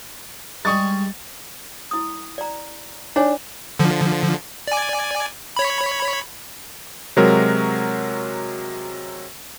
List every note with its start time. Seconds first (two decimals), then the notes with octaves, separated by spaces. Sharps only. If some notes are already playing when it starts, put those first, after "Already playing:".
0.65 G3 G#3 C#6 D#6 A6
1.91 E4 D#6
2.38 D5 A#5
3.16 D4 D#4 C#5 G#5
3.79 D3 F3
4.68 D5 G#5
5.56 C#5 B5
7.17 C3 F#3 G#3 F#4 A#4